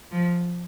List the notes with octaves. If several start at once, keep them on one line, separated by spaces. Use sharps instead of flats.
F3